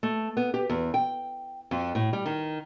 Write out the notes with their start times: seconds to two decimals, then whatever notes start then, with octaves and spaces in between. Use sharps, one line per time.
0.03 A3
0.37 B3
0.54 G4
0.69 E2
0.94 G5
1.71 F2
1.95 A2
2.13 G3
2.26 D#3